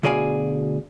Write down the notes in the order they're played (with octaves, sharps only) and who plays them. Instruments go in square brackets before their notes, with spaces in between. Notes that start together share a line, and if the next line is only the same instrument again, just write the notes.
[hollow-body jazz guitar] D2 B2 G#4 D5 F5 G#5